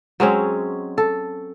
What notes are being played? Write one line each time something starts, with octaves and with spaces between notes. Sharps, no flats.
F#3 G#3 C4 C#4
A4